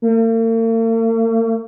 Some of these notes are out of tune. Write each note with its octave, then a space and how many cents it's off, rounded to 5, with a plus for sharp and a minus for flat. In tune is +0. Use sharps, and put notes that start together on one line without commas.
A#3 -45